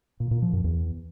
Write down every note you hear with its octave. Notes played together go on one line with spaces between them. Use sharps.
A#2
A#2
F3
F#2
E2